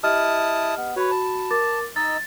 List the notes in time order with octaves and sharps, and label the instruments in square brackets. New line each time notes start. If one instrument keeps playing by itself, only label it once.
[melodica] E4 A5 D#6 [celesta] G4 D#5 F6
[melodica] B3
[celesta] F#4 B5 [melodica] B4 C#5
[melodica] A5
[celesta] A#4 D6 A6
[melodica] D#4 D#5 E6 [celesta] A6